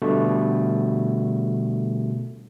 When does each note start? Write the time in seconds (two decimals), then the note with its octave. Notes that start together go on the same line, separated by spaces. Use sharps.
0.02 B2 D3 G3 A3